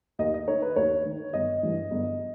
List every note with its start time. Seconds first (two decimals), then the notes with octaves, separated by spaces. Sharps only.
0.19 D#2 D#5
0.34 D#5
0.48 D#3 C#5
0.62 B4
0.76 D#2 C#5
1.05 D#3
1.33 G1 D#5
1.63 G2 E3
1.91 G1